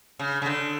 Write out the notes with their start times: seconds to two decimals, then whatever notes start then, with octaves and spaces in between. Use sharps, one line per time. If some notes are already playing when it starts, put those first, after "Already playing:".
0.19 C#3
0.42 C#3
0.46 D3